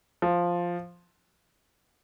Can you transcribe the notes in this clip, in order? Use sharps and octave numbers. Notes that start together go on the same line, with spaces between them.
F3